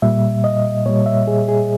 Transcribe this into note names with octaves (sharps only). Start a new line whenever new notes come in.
A#2 G3 E5
D#5
A#2 G3 C#5
E5
G#4
G#4